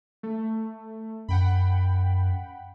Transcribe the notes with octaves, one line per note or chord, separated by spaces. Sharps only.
A3
F#2 F#5 G5 B5